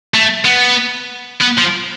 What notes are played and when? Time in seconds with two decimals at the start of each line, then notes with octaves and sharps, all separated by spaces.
0.14 A3
0.45 B3
1.41 B3
1.58 F3